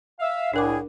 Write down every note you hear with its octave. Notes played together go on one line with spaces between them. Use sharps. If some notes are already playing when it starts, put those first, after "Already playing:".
E5 F5
C2 A2 D4 G#4 A#4 D6